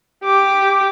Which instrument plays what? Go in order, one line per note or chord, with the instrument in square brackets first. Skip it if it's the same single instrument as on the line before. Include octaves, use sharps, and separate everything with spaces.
[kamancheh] G4 D6